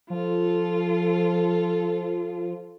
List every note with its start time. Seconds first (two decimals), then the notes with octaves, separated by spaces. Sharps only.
0.10 F3 F4 A4